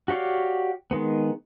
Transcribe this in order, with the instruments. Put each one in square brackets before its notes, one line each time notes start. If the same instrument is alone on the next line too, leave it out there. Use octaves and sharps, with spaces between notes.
[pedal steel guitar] F#4 G4 C#5 D5 F5
D#3 G#3 B3